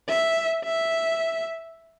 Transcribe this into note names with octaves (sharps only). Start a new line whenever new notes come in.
E5
E5